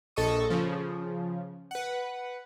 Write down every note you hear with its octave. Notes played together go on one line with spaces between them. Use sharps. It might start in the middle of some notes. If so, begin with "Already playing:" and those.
A#1 A4 D#5 C#6 D#6
C#3 F3
B4 F#5